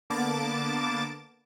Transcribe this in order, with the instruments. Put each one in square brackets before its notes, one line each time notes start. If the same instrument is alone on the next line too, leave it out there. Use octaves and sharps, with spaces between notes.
[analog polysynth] D3 A#3 B3 A5 D6 A6